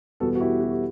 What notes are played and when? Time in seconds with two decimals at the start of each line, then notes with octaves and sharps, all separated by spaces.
0.20 E2 B2 G3 B3 F#4 A4
0.35 F#4
0.40 E4 G4
0.61 F#4
0.71 G4